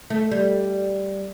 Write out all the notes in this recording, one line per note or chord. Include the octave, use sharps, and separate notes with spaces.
A3
G3